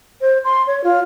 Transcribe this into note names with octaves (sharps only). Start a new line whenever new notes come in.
C5
C6
C#5
F4